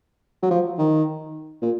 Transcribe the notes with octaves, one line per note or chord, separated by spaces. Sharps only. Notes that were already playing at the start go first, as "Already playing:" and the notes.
F#3
F3
D#3
A#2